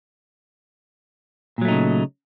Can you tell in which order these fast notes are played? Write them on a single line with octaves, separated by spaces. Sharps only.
A#2 F#3 A3 D#4 C#3